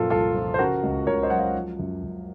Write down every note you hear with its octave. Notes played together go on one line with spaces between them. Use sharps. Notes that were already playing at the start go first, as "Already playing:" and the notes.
Already playing: F#2 A#2 F3 F4 A4
C2 F4 A4
F3
C5
C#3 F#4 A#4
C#2
C#2 A#4 C#5
C5 D#5
F#3 F#5
C#5 F5
F3
F#2
F#2